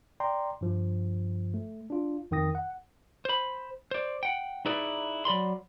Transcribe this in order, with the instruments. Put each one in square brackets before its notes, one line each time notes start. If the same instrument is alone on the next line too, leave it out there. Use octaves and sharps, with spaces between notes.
[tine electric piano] D5 G5 A#5 C6
G2 F3
A3
D4 F4
F2 D#3 G5 D#6 A#6
F#5
[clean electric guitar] C5 B5
C5 D5
F#5 G5
D#4 E4 G#4 B4 D5
F#3 D5 B5 C6